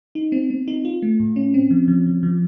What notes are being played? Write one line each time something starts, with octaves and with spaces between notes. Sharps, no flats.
D#4
C4
C4
D#4
F4
A3
A2
C#4
C4
F3
F3
F3
F3